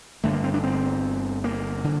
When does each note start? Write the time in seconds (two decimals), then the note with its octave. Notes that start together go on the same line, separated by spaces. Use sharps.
0.24 G1 G2 D3 A3
0.33 A#3
0.44 C4
0.54 D4
0.64 C4
1.44 A#3
1.84 D3